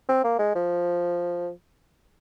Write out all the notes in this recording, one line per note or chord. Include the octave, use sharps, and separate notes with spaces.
C4
A#3
G#3
F3